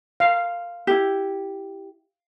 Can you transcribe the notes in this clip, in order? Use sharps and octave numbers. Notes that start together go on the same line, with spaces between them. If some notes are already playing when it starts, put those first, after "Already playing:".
F5
E4 G4